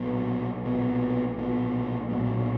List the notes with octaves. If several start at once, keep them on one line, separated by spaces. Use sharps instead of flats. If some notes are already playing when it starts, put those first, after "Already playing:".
Already playing: B1 A#2 F#3 B3
B1 A#2 F#3 B3
B1 A#2 F#3 B3
B1 A#2 F#3 B3